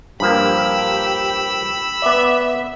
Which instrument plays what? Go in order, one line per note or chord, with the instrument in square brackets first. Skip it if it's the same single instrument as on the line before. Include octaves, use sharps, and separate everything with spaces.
[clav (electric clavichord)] G2 F3 A#3 [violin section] G4 [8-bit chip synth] B5 E6
[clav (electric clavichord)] B3 D5 [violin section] E5